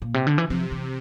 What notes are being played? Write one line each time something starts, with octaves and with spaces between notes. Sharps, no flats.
A#2
C3
D3
E3
C3 F3
E3